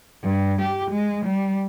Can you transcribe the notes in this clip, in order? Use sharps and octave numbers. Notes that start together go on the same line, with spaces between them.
G2
G4
G#3
G3